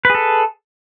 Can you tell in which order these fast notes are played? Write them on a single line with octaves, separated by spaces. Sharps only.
B4 G#4 A4